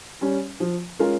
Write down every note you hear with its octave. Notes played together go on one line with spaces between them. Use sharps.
G3 C#4
F3
G#3 C#4 F4 A#4